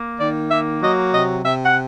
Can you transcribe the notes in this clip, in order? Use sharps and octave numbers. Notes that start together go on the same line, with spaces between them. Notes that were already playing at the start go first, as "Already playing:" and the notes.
Already playing: A#3
D#3 D5
A#3 E5
F#3 D#5
C3 D#5
C3 E5
F#5